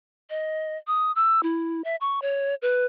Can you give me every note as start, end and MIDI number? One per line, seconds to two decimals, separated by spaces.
0.30 0.77 75
0.87 1.12 87
1.16 1.43 88
1.43 1.84 64
1.84 1.96 76
2.01 2.20 85
2.22 2.55 73
2.62 2.86 71